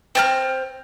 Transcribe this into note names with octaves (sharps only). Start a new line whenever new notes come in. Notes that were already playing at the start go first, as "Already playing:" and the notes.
C4 A5 F6